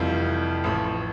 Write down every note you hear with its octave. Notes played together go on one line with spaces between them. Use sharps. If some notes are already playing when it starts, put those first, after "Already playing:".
Already playing: F1 F2 E3 G3 F4
A1 A2 F3